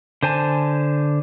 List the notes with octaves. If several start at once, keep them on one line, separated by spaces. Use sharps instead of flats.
D3 C5 G#5 A5